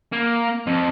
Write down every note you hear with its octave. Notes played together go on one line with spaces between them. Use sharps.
A#3
F2